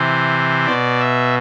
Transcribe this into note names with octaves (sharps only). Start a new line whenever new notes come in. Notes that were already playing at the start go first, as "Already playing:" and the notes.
Already playing: C3 E3 C5
B2 D5
E5